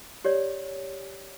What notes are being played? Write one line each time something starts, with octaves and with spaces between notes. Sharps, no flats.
G4 C#5 D5